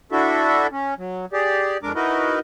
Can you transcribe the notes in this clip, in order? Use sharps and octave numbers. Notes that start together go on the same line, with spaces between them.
D4 E4 F#4 A4 E5
C#4
F#3
G4 G#4 D5
F2 G#3 D4 A#4 D6
D#4 E4 F#4 A#4 B4 D#5